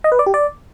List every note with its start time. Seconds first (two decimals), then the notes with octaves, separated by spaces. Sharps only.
0.04 D#5
0.12 B4
0.19 D5
0.26 G4
0.34 D5